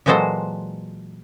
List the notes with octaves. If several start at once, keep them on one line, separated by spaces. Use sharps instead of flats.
A#2 E3 F#3 G#3 A4 C5